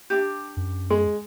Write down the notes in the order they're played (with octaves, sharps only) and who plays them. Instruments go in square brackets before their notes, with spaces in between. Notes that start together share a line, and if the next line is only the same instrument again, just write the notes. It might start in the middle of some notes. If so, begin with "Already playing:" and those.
[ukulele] D4 D#4 G4
[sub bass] F#2
[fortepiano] G#3